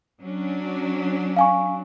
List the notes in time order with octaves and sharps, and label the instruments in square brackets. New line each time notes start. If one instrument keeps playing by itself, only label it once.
[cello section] F#3 C#4 D4
[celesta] F5 G#5 C#6